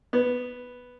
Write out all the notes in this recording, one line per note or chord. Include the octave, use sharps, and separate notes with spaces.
B3